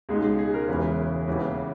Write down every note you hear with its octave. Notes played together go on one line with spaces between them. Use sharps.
C#2 B2 G#3 D#4 G#4
G#4
G#4
A#4
E1 E2 C#3 E3 G#4 B4
D#2 C#3 E3 B3